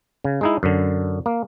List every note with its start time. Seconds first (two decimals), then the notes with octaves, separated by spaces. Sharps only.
0.24 C#3
0.41 G#3 D#4 E4
0.63 F#2 D3
1.26 A#3